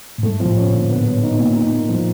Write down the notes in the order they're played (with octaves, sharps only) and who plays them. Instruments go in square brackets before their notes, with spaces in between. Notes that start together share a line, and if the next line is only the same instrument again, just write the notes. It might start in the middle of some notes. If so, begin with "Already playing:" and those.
[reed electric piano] A2
[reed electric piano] G#2 [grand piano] A3
[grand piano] F3
[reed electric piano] A2
[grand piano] C#4
[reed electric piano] A#2 [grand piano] D3
[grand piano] B3
F#3
D#4
A#2
D#4
A#3
F3